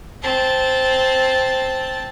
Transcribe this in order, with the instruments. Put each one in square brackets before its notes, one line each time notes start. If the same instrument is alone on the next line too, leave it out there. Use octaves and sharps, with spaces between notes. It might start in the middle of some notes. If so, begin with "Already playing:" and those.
[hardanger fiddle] C4 A5